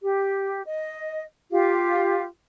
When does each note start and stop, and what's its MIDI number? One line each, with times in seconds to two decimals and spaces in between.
0.02 0.61 67
0.67 1.22 75
1.51 2.24 65
1.51 2.24 67